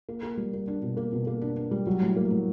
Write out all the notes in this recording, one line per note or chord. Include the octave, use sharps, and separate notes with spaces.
A#3
A#3
G3
A#3
D4
B2
A#3
B2
A#3
D4
D4
G3
F#3
A2
A#3
A2